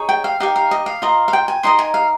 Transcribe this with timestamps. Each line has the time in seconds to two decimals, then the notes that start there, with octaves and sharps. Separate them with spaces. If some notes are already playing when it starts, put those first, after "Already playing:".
Already playing: D#4 G#4 C#5
0.09 G5
0.24 F5
0.40 D#4 G4 A#4 F5
0.56 F5
0.71 D#5
0.86 F5
1.02 F4 A#4 D#5
1.28 F5
1.33 G5
1.48 G#5
1.63 D#4 A#4 D#5 C6
1.79 G#5
1.94 F5